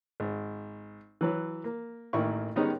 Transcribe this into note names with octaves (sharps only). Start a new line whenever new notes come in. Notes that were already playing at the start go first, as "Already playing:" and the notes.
G#1
E3 F#3 B4
A#3
A1 D#3 A#3 E4 C#6
D#3 G3 G#3 B3 C#4 D#4